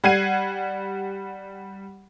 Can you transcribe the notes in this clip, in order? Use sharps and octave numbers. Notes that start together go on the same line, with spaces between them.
G3 F#5 G#6 C7 D#7